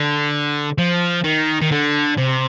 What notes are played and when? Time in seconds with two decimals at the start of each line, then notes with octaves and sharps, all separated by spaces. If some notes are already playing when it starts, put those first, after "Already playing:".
Already playing: D3
0.78 F3
1.24 D#3
1.62 D#3
1.71 D3
2.17 C3